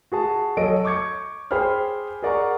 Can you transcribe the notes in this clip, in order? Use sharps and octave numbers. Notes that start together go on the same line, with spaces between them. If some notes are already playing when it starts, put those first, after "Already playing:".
F#4 G#4 A5
F#3 A4 D#5 D7
C#6 D6 G6 G#6 C#7
G#4 C5 G5 B5 F6
G#4 A#4 D5 F#5 A#5 C#6